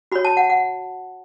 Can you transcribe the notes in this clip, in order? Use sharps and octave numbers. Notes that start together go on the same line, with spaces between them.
F#4 C#5 B5
A5
F#5
F#5